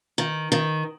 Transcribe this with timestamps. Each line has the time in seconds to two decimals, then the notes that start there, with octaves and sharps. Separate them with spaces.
0.18 D#3
0.52 D#3